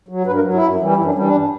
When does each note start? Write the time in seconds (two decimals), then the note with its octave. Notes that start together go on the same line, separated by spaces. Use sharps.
0.08 F#3
0.26 G2 B4
0.35 A#4
0.44 F#3
0.53 E4
0.62 F#2
0.80 E3 G3
0.97 F#2 E4
1.06 D4
1.14 G3 C#4
1.18 E3 D4
1.33 G2